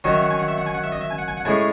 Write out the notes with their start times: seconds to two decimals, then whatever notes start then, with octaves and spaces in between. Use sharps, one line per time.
0.04 D#3 F#3 C#4 D#5
0.13 E5
0.22 F#5
0.30 G#5
0.39 F#5
0.48 E5
0.58 F#5
0.66 G#5
0.74 F#5
0.84 E5
0.92 D#5
1.01 E5
1.10 G#5
1.18 F#5
1.28 G#5
1.37 F#5
1.45 A2 G#3 C#4 G#5